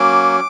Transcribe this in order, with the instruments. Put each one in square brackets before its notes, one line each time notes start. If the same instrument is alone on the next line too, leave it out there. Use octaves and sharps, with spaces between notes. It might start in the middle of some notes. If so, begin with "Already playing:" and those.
Already playing: [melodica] F#3 A#3 C#4 D6